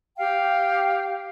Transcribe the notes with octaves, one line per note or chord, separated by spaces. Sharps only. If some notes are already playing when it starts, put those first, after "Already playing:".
G4 F5 G5